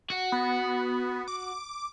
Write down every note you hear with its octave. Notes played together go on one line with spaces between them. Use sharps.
F#4
B3
D6